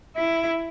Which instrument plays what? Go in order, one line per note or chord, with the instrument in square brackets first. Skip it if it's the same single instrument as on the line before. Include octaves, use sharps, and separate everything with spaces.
[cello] E4